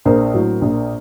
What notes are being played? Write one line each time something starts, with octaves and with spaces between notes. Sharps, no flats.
A#1 A#4 C5
A2 F#3
A#1